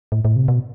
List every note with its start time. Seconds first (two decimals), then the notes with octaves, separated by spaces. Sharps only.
0.12 A2
0.25 A2
0.36 C3
0.48 B2